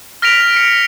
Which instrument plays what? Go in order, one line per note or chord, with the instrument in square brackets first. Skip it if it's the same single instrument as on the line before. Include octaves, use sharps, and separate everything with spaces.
[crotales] F6 A#6 B6 D7 F7
F6 C#7 D7